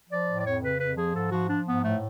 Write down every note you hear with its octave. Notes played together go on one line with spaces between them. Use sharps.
F3 D5
A2
D5
F2 C#5
C#3 B4
F2 B4
F3 G#4
G#2 A4
F3 F#4
F3 D4
G#2 B3
A2 A3